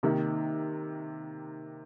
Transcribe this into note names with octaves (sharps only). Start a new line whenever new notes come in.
C3 D#3 A#3